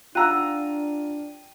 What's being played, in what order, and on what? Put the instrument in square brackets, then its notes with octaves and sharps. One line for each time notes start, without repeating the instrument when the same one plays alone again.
[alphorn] D4 [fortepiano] F4 A#5 [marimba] F#5 E6 F#6 [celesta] G5 D#7